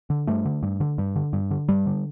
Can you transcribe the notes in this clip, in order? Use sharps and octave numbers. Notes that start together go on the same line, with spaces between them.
D3
G2 A3
D3
G2
D3
G2
D3
G2
D3
G2 G3
D3